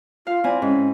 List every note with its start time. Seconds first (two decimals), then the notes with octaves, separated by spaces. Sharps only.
0.27 F4 F5
0.44 C4 E4 D5 G#5
0.62 G#2 C#4